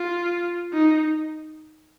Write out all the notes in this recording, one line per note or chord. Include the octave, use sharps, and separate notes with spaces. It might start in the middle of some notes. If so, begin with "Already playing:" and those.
Already playing: F4
D#4